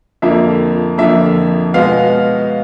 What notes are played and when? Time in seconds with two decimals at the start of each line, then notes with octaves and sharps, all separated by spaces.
0.22 F2 D3 F3 A#3 E5
0.98 F2 D3 F3 A#3 E5
1.74 B2 G#3 B3 F5